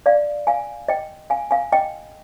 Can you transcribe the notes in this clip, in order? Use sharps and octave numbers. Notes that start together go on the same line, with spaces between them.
D5 F5
F5 G#5
D#5 G5
F5 G#5
F5 G#5
D#5 G5